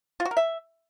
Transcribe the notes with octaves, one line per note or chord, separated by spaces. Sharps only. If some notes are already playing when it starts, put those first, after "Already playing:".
F4
F#4
A#4
E5